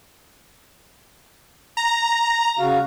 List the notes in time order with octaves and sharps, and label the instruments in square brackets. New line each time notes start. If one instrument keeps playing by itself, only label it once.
[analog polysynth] A#5
[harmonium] C#3 F#4 F5